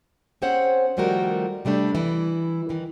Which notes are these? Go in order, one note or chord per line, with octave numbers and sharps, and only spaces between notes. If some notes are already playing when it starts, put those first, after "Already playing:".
C4 C#4 G#4 C5 C#5 F#5
D#3 F3 G3 A3 F#4 A#4
C3 G3 A3 D4
E3 E4
D#3 E3